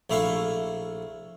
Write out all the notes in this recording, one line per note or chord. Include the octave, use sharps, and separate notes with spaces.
A#1 A3 E4 F5 C#6